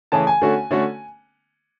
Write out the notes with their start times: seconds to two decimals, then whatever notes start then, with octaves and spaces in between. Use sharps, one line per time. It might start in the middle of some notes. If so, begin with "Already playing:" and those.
0.12 C#3 E3 A3 C#4 G#4 A5
0.27 G#5
0.41 D3 A3 C#4 F#4
0.71 D3 A3 C#4 F#4